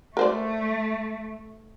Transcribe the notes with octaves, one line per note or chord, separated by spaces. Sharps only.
A3 A#4 C5 D5